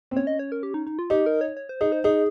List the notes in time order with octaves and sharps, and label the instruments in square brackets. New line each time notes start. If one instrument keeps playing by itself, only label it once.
[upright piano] C4
[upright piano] C#4 [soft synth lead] C#5
[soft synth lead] D#5
C#5
A#4
G4
D#4
D#4
F4
[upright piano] D#4 [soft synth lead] G4
[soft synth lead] A#4
C#5
C#5
C5
[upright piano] D#4 [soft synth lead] G#4
[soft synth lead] C5
[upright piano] D#4 [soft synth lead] G#4